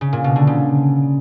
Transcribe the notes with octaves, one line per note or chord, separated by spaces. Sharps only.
C#3
A#2
B2
D3
C#3